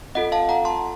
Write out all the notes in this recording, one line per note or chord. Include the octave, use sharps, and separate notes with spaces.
C4 F4 A4 D#5 F#5
F5 A5
F#5 A#5
A5 C6